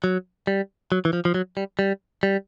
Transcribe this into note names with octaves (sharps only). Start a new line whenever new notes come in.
F#3
G3
F#3
E3
F3
F3
F#3
G3
G3
G3